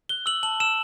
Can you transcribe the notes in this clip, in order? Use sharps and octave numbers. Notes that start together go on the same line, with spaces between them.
F#6 G7
E6 F#7
A5 F#7
E6 E7